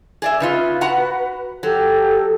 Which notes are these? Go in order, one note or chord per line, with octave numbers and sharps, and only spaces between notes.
G#4 D5 E5
C#3 D#4 F4 B4
F#4 F#5 A#5
F#3 G4 A4